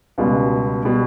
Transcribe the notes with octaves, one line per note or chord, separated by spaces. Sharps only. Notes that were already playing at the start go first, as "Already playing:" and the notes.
C#2 B2 G3
B2 G3